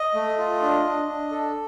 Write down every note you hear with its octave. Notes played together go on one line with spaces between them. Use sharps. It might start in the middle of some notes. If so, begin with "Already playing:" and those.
Already playing: D#5
A3
F4
D4
D4
D4
A4